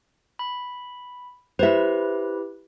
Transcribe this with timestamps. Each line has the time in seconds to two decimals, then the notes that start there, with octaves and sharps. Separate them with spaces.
0.39 B5
1.59 E4 G4 B4 C5 E5